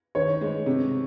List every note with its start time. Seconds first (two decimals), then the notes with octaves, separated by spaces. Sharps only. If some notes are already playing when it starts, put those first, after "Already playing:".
0.15 D#3 C#5
0.41 G#3
0.66 C3